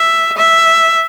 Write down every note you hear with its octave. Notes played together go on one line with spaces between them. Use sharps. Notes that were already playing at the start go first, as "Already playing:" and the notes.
Already playing: E5
E5